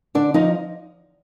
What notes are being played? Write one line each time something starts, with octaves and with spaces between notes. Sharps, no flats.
D3 D4 D5
F3 D#4 D#5